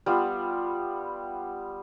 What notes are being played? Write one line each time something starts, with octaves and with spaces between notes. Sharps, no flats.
G3 B3 F4